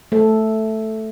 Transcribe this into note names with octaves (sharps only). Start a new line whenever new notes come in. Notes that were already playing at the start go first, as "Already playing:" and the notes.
A3 A4